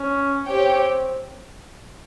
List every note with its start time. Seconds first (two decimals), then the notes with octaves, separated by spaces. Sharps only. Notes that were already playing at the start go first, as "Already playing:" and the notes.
Already playing: C#4
0.46 C4 G4 C#5 G5